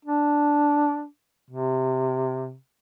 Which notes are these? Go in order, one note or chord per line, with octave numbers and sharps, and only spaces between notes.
D4
C3